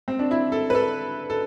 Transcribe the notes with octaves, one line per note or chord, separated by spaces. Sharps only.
C4
D4
E4
A4
B4
A4
A4